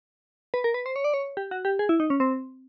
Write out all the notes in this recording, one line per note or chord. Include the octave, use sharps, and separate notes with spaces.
B4
A#4
B4
C5
C#5
D5
C#5
G4
F#4
G4
G#4
E4
D#4
C#4
C4